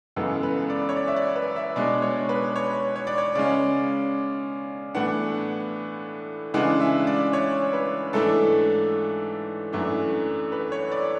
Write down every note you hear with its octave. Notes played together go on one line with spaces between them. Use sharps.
F#2 C#3 E3 G#3 B3 A4
B4
D5
C#5
D5
E5
D5
B4
E5
B2 G#3 D4 D5
C#5
B4
C#5
C#5
D5
C#5
C#3 G#3 C#4 D5
A2 E3 B3 D4 F#5
C#3 E3 G#3 D4 F#5
E5
D5
C#5
B4
G#2 E3 A3 D4 A4
F#2 E3 A3 D4
B4
C#5
D5